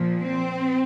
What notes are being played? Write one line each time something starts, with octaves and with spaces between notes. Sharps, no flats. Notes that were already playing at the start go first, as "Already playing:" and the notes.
Already playing: A#2 F3
C4